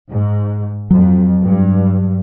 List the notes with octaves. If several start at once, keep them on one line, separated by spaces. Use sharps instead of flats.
G#2
F2 F#3
G2